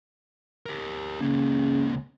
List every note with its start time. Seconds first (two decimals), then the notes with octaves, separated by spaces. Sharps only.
0.66 G4 A#4
1.21 C#2 C#3 A#3